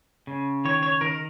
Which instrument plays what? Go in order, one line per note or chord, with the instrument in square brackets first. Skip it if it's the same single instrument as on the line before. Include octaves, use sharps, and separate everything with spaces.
[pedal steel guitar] C#3
D#3 C#5
C#5
D#3 A#4